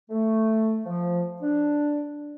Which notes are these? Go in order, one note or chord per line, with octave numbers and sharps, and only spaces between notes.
A3
F3
D4